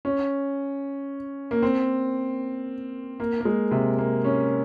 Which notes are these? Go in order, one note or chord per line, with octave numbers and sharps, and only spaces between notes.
C#4
A#3
C4
A#3
A#3
G#3
C3
A#3
C#4